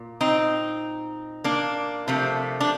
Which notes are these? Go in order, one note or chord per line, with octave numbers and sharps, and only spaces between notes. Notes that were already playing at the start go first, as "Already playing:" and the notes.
Already playing: A#2
C4 D#4
A#3 D4
C3 F3 A3
D4